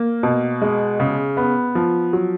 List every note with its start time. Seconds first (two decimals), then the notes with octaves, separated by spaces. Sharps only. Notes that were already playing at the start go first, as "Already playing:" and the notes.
Already playing: A#3
0.23 B2
0.62 G#3
1.00 C#3
1.37 B3
1.75 F3
2.13 F#3